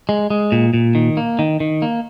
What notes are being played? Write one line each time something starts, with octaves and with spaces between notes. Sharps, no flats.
G#3
G#3
A#2
A#2
D#3
A#3
D#3
D#3
A#3